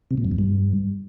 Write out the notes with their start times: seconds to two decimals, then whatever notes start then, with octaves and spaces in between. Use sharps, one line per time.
0.11 C3
0.18 A#2
0.25 F#2
0.32 F2
0.39 G2